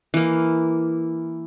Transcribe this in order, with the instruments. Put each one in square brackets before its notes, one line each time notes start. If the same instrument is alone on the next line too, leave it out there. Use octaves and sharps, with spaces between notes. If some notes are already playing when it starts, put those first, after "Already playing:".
[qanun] E3 A#3